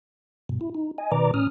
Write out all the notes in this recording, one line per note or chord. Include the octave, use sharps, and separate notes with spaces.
G2 B2
E4
D#4
D#5 G#5
B2 D#3 B4 D5 A#5 D6
A2 C#4 D#6 F6